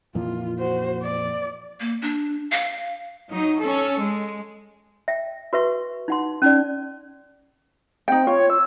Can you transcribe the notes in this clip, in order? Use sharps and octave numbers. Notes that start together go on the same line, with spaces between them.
F2 A#2 E3 F4
F#4 C5
D5
A#3
D4
F5
F#3 D#4
C#4 A4
G#3
E5 G5
F#4 B4 E5 C#6
D#4 F#5 C6
C#4 D#4 D5
C4 D#4 G5
F4 C#5
E6